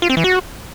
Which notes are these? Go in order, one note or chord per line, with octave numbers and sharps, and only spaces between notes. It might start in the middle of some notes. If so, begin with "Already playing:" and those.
F4
C4
E3
F#4